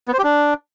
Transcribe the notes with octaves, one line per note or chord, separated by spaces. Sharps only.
B3
C5
G4
D4